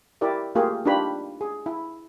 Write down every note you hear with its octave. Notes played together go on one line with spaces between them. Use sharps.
E4 G4 A#4 D5 E5
A3 A#3 F4 G4 G#4 A#4
D4 D#4 F4 G4 B4 B5
G#4
E4